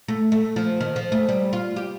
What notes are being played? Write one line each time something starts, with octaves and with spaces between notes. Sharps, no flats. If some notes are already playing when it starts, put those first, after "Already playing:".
A3
A3
F3
D#3
F3
A3
G3
F4
G4